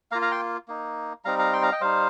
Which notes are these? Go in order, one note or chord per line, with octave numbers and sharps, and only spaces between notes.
A#3 F4 F5 A#5
F5 A#5
G5 C6
A#3 D#4
G3 C4 D#4 F5 A#5
F5 A#5
G5 C6
F5 A#5
D#5 G5
G3 D#4 C5 F5